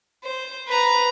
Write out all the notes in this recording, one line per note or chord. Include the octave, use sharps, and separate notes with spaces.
C5
B4 A#5